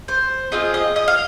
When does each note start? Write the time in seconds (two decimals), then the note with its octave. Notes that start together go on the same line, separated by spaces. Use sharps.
0.08 C5
0.52 C4 F4 G#4 D#5
0.74 D#5
0.96 D#5
1.08 F5